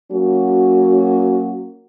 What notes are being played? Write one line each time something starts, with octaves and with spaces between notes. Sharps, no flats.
F#3 A#3 C#4 F#4